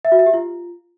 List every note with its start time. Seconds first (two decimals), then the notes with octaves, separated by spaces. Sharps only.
0.05 E5
0.12 F#4
0.19 E5
0.26 G4
0.34 F4